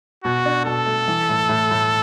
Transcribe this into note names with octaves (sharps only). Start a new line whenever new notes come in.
B2 F#4
D4
B2 A4
A3
E3
A2
A2
A2